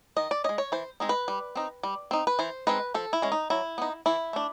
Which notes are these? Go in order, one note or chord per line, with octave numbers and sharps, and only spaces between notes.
D#3 D#5
D5
G#3 C#4 D#5
C#5
E3 C5
G#3 C4 D#4
B4
G3
C4 D#4
G3
C4 D#4
B4
E3 C5
G#3 C4 D#4 B4
F3 A4
E4
G#3 C#4
D#4
F#3 E4
B3 D#4
E3 E4
A3 D4